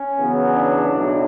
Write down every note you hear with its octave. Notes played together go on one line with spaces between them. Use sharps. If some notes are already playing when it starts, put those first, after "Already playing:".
Already playing: C#4
E2 C#3 F#3 B3
D4
B1 A2 F#3